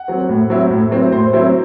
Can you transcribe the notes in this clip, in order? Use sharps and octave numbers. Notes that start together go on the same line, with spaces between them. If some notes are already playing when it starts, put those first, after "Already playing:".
Already playing: F#5
F#3 C4
A2
F#3 C4 E4
A2
F#3 C4 E4
A2 C5
F#3 C4 E4 C5